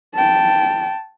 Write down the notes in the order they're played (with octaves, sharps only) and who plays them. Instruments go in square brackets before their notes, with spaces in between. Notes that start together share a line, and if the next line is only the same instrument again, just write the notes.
[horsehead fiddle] G5 A5